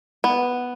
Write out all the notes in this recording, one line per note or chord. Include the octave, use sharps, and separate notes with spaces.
B3